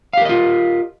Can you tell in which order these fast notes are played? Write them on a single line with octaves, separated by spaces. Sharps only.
F5 G4 A#4 D#5 F4